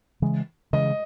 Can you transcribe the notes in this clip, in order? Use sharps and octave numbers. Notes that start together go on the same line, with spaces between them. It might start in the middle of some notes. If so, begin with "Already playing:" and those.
C#3 E3 G#3
C#3 E3 G#3 D#5